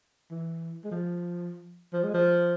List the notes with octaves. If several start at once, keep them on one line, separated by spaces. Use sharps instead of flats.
E3
G#3
F3
F3
G#3
F3